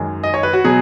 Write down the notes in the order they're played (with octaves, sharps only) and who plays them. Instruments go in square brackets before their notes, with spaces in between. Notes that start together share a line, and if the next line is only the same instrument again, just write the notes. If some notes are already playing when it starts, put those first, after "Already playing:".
Already playing: [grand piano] F#2 D#3 G#3
D#5
C#5
B4
F#4
B2 F#3 G#4